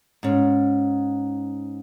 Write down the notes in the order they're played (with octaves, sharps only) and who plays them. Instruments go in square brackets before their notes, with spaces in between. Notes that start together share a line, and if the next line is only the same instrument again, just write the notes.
[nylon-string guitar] G#2 C#4